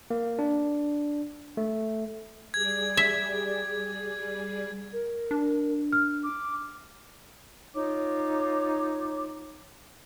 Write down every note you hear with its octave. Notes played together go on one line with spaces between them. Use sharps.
A#3
D4
A3
G3 G#4 D5 G#6
E5
A#4
D4
F6
D6
D#4 F4 C#5 D6